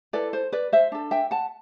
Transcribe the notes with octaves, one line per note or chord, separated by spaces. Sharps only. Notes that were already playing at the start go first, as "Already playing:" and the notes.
E4 A4 B4 D5
C5
B4 D5
C5 E5
D4 A4
E5 G5
F#5 A5